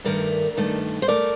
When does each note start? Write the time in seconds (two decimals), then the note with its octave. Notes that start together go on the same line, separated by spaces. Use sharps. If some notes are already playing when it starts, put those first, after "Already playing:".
0.05 G2 D#3 A3 A#4 D5
0.57 G2 D#3 A3
1.02 C5
1.08 D#3 A3 A#4 D5